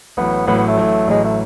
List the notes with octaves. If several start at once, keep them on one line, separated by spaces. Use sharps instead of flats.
A1 A2 F#3 B3
A1 A2 F#3 B3
B3
A3
A1 A2 F#3
A1 A2 F#3 G#3
A3